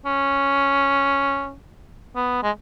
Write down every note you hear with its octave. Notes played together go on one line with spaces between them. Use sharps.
C#4
B3
G#3